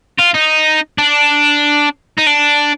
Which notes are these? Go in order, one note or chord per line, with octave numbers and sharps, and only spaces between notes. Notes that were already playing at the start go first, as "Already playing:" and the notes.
F4
D#4
D4
D#4
D4